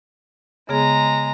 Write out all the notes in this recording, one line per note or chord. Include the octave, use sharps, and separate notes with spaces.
C#3 G#3 B3 G#4 A#5